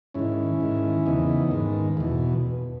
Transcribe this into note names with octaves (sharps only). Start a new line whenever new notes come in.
G#2 D#3 C#4 E4
G#2 D#3
E2 C#3 E3 B3 D#4
G#2 D#3
E2 B2